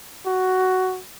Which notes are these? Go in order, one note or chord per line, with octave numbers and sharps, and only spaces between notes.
F#4